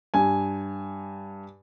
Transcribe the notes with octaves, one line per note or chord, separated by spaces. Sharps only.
G2 G#5